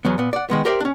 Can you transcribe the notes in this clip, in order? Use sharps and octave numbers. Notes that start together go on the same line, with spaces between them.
E2 F#3 B3
A#2 B3
D5 F#5
D#3 G#3 B3
G4 A#4 C5 D5 E5 G5
C#4 D4